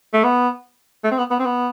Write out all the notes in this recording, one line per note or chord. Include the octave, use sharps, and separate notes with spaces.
A3
B3
A3
C4
B3
B3
C4
B3